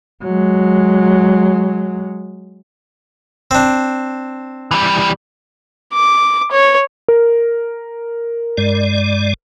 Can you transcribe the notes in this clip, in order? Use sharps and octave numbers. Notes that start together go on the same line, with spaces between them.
F#3 G#3
C4 D4
E3 G3
D6
C#5
A#4
G2 G#3 D5